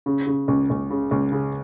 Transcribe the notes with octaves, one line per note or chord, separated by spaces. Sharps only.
C#3
C#3
C#2
C#2
C#3
C#2
C#3